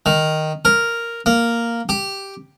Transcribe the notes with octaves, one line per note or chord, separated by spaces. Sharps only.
D#3
A#4
A#3
G4